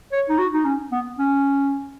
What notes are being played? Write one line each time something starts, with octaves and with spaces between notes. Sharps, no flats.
C#5
D#4
F#4
D#4
C#4
B3
C#4